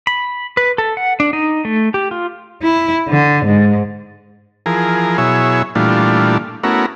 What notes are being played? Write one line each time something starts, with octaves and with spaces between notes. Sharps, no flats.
B5
B4
A4
F#5
D4
D#4
A3
G4
F4
E4
D3
G#2
E3 F3 G#4 A#4
B2 F#3 E4 G#4 C#5 E5
A#2 E3 G3 A3 D4 F4
A3 B3 C#4 E4 F#4 A#4